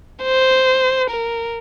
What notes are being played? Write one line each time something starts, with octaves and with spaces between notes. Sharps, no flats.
C5
A#4